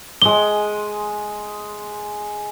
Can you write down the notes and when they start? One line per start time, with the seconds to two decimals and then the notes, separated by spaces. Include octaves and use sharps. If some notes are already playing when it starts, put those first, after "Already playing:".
0.22 G#3 D#6 G7